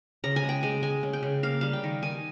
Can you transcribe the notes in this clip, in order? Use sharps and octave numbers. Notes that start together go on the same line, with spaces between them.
C#3 A#5
G#5
G#3
G5
G#3 G#5
G#3 G#5
C#3
G5
C#3
A#3 F5
G3 F5
G5
D#3
D#3 G#5